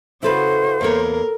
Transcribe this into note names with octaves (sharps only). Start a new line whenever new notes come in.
C#3 E4 F#4 A4 B4 C5
E2 A#3 A4 A#4 C#5